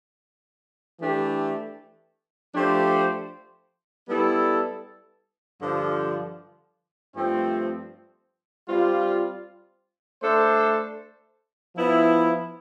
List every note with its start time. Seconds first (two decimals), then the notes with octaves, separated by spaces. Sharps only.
1.00 E3 A3 D4 G4
2.54 F3 A3 D4 G4 C5
4.08 G3 B3 E4 A4
5.61 G2 D3 F3
7.15 G2 F3 A3 C4
8.68 G3 C4 F4
10.22 A3 D4 A4 C5
11.76 F3 B3 E4